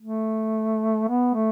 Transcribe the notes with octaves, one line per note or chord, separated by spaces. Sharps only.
A3
B3
A3